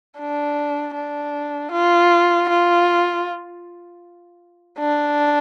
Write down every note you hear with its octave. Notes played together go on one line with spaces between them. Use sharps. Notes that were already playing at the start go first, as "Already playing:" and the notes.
D4
D4
F4
F4
D4